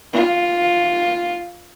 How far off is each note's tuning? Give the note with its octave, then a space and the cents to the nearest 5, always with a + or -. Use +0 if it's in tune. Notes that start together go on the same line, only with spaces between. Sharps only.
F4 +5